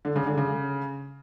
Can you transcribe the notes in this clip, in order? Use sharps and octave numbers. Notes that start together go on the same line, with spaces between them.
D3
C#3
D3
C#3